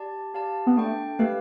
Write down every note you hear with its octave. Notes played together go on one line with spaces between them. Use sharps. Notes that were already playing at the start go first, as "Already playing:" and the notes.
Already playing: G4 D5 A5
G4 D5 F5 A5
B3
A3 D4 A4 D5 G5
A3 G4 B4 F5